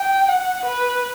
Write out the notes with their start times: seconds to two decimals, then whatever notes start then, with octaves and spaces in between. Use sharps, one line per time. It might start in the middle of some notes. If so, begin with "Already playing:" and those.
Already playing: G5
0.28 F#5
0.65 B4